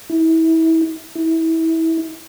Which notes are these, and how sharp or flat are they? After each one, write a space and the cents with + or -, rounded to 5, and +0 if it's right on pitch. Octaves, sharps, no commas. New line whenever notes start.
E4 -30
E4 -25